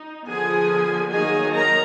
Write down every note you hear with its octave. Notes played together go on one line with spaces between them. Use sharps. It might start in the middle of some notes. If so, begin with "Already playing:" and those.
Already playing: D#4
D3 F3 B3 G#4 G#5
D#3 F#3 A#3 D#4 G#4 G#5
A#4 A#5